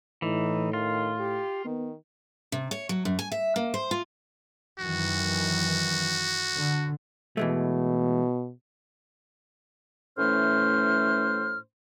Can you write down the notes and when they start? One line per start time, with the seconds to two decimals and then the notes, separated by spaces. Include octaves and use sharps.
0.22 A2 E3 D#4
0.73 D#3 F4
1.20 G4
1.65 D#3 B3
2.52 C3
2.71 C#5
2.89 F#3
3.05 F#2
3.19 G#5
3.32 E5
3.56 A#3
3.74 C5
3.91 F4
4.79 F#2 D#3 E3 F#4
6.56 D3
7.37 B2 E3 G#3 A3
10.18 A2 E3 A3 C#4 C5 F6